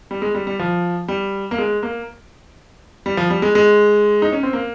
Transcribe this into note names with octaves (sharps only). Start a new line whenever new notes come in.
G3
G#3
G3
G3
F3
G3
A#3
G#3
A#3
G3
F3
G3
G#3
G#3
D#4
C#4
C4
A#3